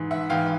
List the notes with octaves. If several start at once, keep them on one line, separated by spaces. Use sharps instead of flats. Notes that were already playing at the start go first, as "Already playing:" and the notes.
Already playing: G#2 E3
E5 F#5
G#2 E3 F5 G5